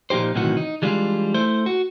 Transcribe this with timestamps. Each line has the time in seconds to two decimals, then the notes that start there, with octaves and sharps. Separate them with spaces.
0.10 A#2 F3 D#4 G4 C5
0.35 B1 A2 C3 D#3 E3 F#4
0.57 D#4
0.82 E3 G3 G#3 D4 F4
1.34 A3 E4 C5
1.66 F#4